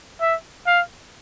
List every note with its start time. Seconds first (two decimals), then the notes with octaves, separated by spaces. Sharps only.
0.21 E5
0.66 F5